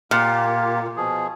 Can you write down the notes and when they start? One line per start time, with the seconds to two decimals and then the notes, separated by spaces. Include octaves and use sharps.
0.11 A#2 A#3 F4 G4
0.96 B2 F3 G#4